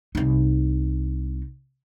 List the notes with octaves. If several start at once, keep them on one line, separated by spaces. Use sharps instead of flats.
C2 D#4